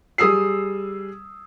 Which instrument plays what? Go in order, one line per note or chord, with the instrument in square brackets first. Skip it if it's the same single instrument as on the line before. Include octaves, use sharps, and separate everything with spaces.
[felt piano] G3 G#4 D#6 E6 C7